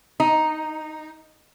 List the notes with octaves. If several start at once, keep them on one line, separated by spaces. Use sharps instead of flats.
D#4